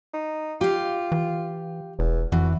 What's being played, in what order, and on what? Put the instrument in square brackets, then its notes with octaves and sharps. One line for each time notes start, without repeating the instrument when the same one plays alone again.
[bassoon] D#4
[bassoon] F4 [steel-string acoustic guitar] G4 F5
[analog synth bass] E3
[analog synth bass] E1 [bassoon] E2
[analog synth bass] F2 [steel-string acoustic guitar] E3 [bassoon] F#4